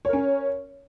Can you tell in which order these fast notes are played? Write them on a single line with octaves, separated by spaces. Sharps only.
C#5 A#4 C#4